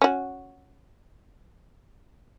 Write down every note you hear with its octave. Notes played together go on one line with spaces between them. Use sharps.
C#4 F#4